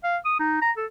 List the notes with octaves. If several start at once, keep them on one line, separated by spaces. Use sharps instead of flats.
F5
D#6
D#4
A#5
A4